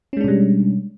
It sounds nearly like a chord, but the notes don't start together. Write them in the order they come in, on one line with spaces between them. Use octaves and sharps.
C#4 G#3 D4 B2 G3